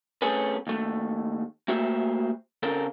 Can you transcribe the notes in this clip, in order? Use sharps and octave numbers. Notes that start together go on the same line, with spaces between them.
A3 C4 C#4 G#4 A4 B4
D#2 A3
A3 A#3 F#4 G4 C5 E5
C#3 C4 A4 A#4